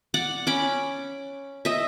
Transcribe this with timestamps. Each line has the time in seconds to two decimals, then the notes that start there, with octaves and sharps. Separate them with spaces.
0.14 D5 F#5
0.47 C#4 B5 D6
1.65 D#5 E5